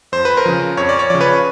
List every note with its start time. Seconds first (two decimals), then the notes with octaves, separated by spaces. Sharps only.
0.12 F2 C5
0.25 B4
0.37 A#4 C5
0.46 C#3 F3
0.77 F2 C#5
0.89 D5
0.99 C#5
1.10 C#3 F3 D5
1.21 B4 C#5